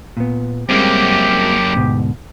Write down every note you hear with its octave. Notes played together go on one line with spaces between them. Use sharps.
A#2 B3
F#2 G3 G#3 A#3 C4 G4
D2 G#2 B2